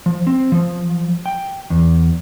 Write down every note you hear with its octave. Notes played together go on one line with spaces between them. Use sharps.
F3
C4
F3
G5
E2